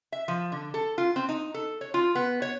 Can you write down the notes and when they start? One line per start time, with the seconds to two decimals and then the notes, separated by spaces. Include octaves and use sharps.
0.12 E5
0.28 F3
0.52 D3
0.74 A4
0.98 F4
1.16 C4
1.29 D#4
1.54 A4
1.81 C#5
1.94 F4
2.15 B3
2.42 C#5